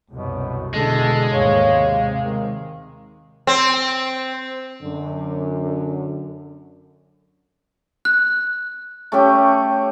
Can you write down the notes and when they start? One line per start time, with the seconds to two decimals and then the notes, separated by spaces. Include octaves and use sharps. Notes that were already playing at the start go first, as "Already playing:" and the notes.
0.10 C2 F#2 B2
0.74 E2 B2 D3 G#3 A4
1.31 D#2 G#2 C#5 F5
1.72 C3
2.19 D#3
3.47 C4
4.83 F#2 D3
8.05 F#6
9.12 A3 C#4 G4